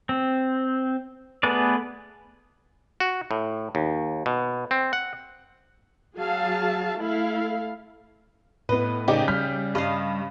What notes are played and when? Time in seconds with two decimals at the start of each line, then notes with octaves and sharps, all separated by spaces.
0.09 C4
1.43 A3 B3 G#4 B4 D5
3.00 F#4
3.31 A2
3.75 D#2
4.26 B2
4.71 C4
4.93 F#5
6.17 F#3 G#4 F5 A5
6.99 A3 E4 A4 F5
8.69 A2 B3 B4 D#5
9.08 C#3 D#4 G4 D5
9.28 G3 F6 G6 B6
9.75 G2 D#5 F5